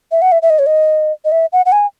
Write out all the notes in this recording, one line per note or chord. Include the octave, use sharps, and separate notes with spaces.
E5
F#5
E5
E5
D#5
C#5
D#5
D#5
E5
F#5
F#5
G#5